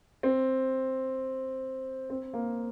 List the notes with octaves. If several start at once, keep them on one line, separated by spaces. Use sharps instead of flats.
C4
C4
A#3